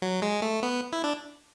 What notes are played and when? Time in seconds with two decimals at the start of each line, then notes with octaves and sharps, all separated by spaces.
0.02 F#3
0.22 G#3
0.42 A3
0.63 B3
0.92 E4
1.04 D4